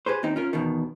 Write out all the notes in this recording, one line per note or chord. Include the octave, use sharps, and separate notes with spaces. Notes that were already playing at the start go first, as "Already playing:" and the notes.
G4 G#4 B4 C5
D#2 C4 D#4 G4
C#4 F4 A#4
E2 B2 D#3